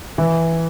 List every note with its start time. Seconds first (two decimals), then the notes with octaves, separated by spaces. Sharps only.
0.18 E3